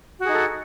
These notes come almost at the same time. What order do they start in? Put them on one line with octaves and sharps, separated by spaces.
F#4 G#4 D#4 A4